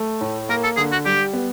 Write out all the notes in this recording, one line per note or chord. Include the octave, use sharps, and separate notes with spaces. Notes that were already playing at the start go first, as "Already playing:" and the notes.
Already playing: A3
A2
A#3 A#4
A4
D3 G#4
F#4
G3 G4
B3